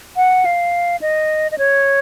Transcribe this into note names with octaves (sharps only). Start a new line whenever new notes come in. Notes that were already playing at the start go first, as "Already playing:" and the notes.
F#5
F5
D#5
D#5
C#5